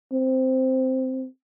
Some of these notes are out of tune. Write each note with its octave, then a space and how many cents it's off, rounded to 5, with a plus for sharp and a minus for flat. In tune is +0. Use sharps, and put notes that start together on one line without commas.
C4 -5